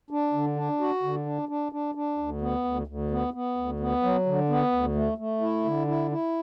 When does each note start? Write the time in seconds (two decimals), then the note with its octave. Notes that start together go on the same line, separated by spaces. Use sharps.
0.11 D4
0.33 D3
0.56 D4
0.80 F#4
1.03 D3
1.26 D4
1.49 D4
1.72 D4
1.95 D4
2.18 D2
2.41 B3
2.64 D2
2.87 D2
3.11 B3
3.34 B3
3.57 D2
3.80 B3
4.03 F#3
4.26 D3
4.49 B3
4.72 D2
4.95 A3
5.18 A3
5.41 E4
5.65 D3
5.87 E4
6.11 E4